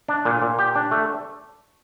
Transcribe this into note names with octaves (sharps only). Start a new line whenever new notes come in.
D4
A#2
A#2
G4
D4
A3